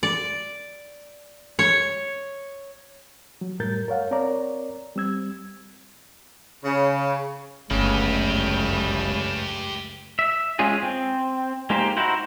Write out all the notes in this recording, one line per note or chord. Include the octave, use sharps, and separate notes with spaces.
D5
C#5
F#3
F#2 A2 G3 A#4 G6 A6
A#4 C#5 F5 F#5
C4 A#4 C#5 D5 A#5
G3 C4 E6 G#6
C#3
G1 C#2 F#2 C#3 A3 G4 B4
E5
G#3 C#4 F4 G#4
C4
G#3 A#3 D#4 G4 C5
D#4 E4 F#4 C5 F#5